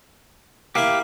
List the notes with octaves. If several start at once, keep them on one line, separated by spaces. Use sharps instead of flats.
A#3 E4 G4 F5